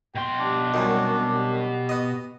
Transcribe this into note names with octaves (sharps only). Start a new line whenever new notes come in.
B2 G5 C6
D4 G4
C2 F#2 D#3 F#4
G4
B3 D#5